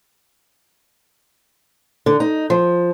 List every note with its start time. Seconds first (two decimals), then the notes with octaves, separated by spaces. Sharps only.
2.06 D3
2.20 D#4
2.50 F3